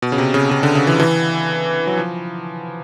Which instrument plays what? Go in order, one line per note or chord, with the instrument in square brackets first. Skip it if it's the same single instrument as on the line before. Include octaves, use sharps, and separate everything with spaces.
[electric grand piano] B2
C#3
C3
C#3
C#3
D3
C#3
E3
E3
F#3
F3